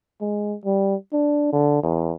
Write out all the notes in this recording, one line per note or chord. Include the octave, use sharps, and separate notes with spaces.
G#3
G3
D4
D3
E2